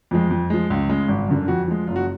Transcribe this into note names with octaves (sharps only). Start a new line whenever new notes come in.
F2 F3 G#3
F2
F3 G#3
C#2
C#3 G#3
G#1
F#2 D3 F#3
F2 F#4
F3 G#3
F#1 F4
F#4